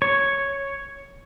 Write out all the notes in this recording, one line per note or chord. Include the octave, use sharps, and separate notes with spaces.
C#5